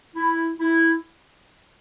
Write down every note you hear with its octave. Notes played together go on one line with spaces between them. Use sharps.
E4
E4